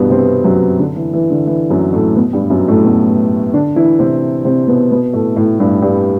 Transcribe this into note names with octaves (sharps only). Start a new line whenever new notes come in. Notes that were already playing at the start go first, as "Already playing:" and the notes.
Already playing: G2 B2 E3 G3 B3
C3 C4
F#2 F#3
D3
E3
E3
D3
E3
F#2 F#3
A2 A3
B2 B3
G2 G3
F#2 F#3
A2 A3
B2 B3
D3 D4
E3 E4
C3 C4
C3 C4
B2 B3
B2 B3
A2 A3
A2 A3
G2 G3
G2 G3